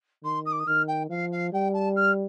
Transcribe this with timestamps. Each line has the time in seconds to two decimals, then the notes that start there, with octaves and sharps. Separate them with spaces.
0.23 D#3 C6
0.45 D#6
0.51 D6
0.59 D#6
0.66 D#3 F6
0.87 G5
1.09 F3 F5
1.31 F5
1.52 G3 G5
1.73 A5
1.96 F6